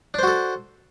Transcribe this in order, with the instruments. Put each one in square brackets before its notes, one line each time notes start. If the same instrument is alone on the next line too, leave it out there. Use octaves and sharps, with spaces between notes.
[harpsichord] D4
C5
F#4
A4